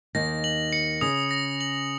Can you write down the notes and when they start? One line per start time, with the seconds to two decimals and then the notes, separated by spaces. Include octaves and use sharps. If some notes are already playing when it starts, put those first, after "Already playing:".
0.15 D#2 D#3 A#6
0.44 F#7
0.73 C#7
1.01 C#3 D#6
1.31 A#6
1.61 F#7